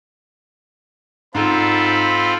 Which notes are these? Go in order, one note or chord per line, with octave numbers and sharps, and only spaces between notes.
G#2 C4 F4 A4 B5